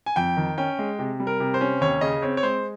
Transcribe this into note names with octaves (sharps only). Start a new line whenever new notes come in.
G#5
F2 G5
D#3
C#4 G5
G#3
C3
G3
A#4
C3
C5
C#4
D#2 C#5
C#3 D#5
C4 C#5
C#5
G#3 C5